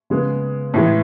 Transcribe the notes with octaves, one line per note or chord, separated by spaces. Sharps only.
C#3 G#3 B3
A2 E3 G#3